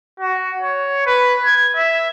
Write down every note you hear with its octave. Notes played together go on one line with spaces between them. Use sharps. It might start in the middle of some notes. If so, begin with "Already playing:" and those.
F#4
C#5
B4
G#6
E5